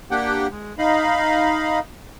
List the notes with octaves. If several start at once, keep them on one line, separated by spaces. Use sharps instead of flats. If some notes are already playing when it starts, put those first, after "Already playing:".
A#3 D4 G4 F#5 G5
G#3
D#4 D#5 F5 B5